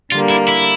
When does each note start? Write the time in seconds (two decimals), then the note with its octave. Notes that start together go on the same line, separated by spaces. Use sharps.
0.12 D3 G3 A#3 F4
0.30 E4
0.48 E4